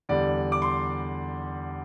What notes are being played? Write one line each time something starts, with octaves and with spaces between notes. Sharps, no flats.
E2 D3 G3 D5
D6
C6